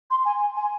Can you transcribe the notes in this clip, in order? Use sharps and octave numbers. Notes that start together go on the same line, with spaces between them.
C6
G#5
G#5